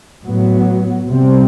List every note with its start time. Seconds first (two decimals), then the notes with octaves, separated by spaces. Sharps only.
0.23 A2 F#3 B3
1.06 C3 G3 C4